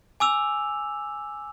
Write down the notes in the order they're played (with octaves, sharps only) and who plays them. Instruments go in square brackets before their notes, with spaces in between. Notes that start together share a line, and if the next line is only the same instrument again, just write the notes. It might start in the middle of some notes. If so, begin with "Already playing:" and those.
[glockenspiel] G#5 D6 E6 F7